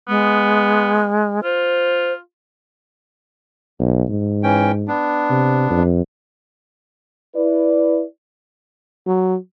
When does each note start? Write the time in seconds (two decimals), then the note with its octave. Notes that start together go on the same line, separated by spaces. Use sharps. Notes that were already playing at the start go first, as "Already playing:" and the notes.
0.09 G#3 B3
1.44 F4 C5
3.80 B1
4.09 G#2
4.43 E3 C#4 G5
4.88 B3 D4
5.30 C3
5.71 F2
7.35 E4 B4 D5
9.06 F#3